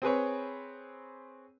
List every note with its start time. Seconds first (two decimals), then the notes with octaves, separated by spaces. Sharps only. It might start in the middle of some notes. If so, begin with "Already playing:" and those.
0.02 C4 G#4 B4 C#5